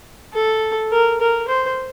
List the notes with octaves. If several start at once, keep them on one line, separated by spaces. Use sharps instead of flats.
A4
A#4
A#4
C5